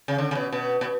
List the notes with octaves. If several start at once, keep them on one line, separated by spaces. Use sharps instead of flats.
C#3
D3
C#3
B2
B2
B2